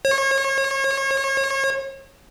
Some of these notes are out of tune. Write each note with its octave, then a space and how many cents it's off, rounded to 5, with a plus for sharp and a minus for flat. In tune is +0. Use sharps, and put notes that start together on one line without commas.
C#5 -35